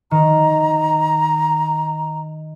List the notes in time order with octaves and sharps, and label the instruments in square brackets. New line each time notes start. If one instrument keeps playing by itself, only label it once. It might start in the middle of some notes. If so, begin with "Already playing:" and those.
[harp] D#3 [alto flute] A#5